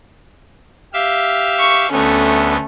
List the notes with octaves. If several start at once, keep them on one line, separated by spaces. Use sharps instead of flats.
G4 E5 F5
C#6
D2 A3 B3 C#4